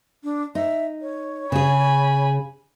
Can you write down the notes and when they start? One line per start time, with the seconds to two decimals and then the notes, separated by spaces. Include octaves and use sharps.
0.23 D4
0.55 D#4 E5
1.02 C#5
1.52 C#3 G#4 G#5 B5